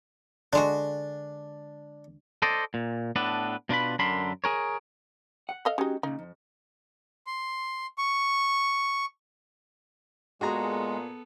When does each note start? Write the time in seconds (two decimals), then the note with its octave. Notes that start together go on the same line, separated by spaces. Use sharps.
0.53 D3 G#3 D4 F#4
2.42 A4 C5 D5 D#5
2.74 A#2
3.16 A2 B3 D4 A4 B4
3.69 B2 D4 F4 B4 B5
3.99 F#2 D3 D4 A#4 B5 C6
4.44 G#4 A#4 C#5
5.49 F#5
5.65 A4 D#5 F5
5.78 G#3 C#4 D#4 F#4 G4
6.03 A#2 C#3 D#4
6.19 F2
7.27 C6
7.98 C#6
10.41 A#2 G#3 B3 F#4 G#4 A4 A#5